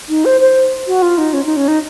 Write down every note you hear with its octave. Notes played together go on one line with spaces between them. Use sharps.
D#4
C5
C5
F#4
F4
D#4
C#4
D#4
C#4
D#4